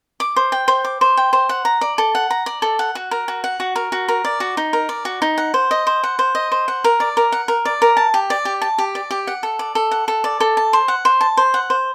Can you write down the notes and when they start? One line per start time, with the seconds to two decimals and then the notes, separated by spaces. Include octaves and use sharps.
0.20 D6
0.36 C5
0.52 G5
0.68 C5
0.85 D6
1.01 C5
1.17 G5
1.33 C5
1.49 F#5
1.65 A#5
1.81 D5
1.98 A4
2.15 F#5
2.31 A#5
2.46 D5
2.62 A4
2.79 F#5
2.95 F#4
3.11 A#4
3.28 F#4
3.44 F#5
3.60 F#4
3.76 A#4
3.92 F#4
4.08 A#4
4.25 D5
4.40 F#4
4.57 D#4
4.73 A#4
4.89 D5
5.05 F#4
5.22 D#4
5.38 F#5
5.54 C5
5.71 D#5
5.87 C5
6.03 F#5
6.19 C5
6.35 D#5
6.52 C5
6.68 F#5
6.84 A#4
7.00 D5
7.17 A#4
7.32 F#5
7.48 A#4
7.65 D5
7.82 A#4
7.97 A5
8.14 G4
8.30 D5
8.45 G4
8.62 A5
8.78 G4
8.95 D5
9.11 G4
9.27 F#5
9.43 A4
9.59 D5
9.75 A4
9.91 F#5
10.08 A4
10.24 D5
10.40 A4
10.57 A5
10.73 C5
10.88 F#5
11.05 C5
11.21 A5
11.37 C5
11.54 F#5
11.70 C5